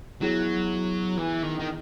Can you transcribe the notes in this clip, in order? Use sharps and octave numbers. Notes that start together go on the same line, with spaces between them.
F#3 B3 E4 G#4
E3
D#3
D#3